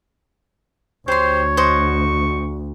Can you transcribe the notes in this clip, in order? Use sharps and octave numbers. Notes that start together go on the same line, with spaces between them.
D2 G4 C5 C#5 C6
C5 D#5 F#5 C#6